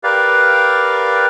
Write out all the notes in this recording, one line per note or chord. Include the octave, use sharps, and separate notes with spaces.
G4 A#4 B4 D5 F5